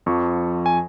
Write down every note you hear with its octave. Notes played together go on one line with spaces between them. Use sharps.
F2 F3 C#6
G#5